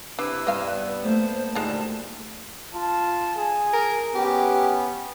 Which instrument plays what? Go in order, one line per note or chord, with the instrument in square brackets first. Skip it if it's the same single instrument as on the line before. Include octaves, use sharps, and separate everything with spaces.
[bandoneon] C3 E4 E6 [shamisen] D4 [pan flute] B4
[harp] G2 [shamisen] D#5 F5
[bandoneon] B3
[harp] A3 A#3 [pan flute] C5
[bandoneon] D2 A#2 G3 [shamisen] G#3 D#4 [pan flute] A5
[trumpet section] F4 A5
G#4 G#5
[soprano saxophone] A#4
[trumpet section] B3 C#4 [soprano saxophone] G4